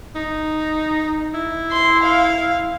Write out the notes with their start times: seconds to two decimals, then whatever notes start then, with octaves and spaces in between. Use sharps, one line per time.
0.15 D#4
1.34 E4
1.72 C6
2.03 F5